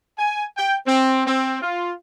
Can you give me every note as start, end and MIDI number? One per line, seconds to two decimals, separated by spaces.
0.19 0.44 80
0.58 0.75 79
0.86 1.24 60
1.27 1.60 60
1.62 1.92 65